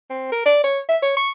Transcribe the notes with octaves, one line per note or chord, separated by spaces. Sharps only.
C4
A#4
D5
C#5
E5
C#5
C#6